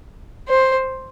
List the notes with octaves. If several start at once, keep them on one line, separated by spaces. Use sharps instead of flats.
C5